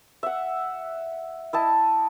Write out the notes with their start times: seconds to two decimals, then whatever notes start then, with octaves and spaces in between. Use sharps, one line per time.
0.23 E5 F#5
1.53 E4 D#5 A5